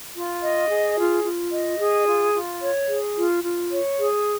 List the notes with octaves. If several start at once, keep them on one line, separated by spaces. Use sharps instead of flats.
F4
D#5
G#4
F4
F4
D#5
G#4
F4
F4
C#5
G#4
F4
F4
C#5
G#4